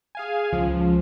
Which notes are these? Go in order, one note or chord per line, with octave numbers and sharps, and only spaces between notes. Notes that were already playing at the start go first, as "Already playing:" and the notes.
G#4 F5 G#5
C#2 F3